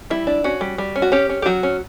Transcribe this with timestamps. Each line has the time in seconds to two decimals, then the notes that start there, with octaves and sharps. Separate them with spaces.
0.10 G3 E4
0.27 D4
0.44 C#4 F#4
0.61 G3
0.78 G3
0.96 C#4
1.02 F#4
1.12 C#4 G4
1.29 C#4
1.42 G4
1.46 F#3 F#4
1.63 C#4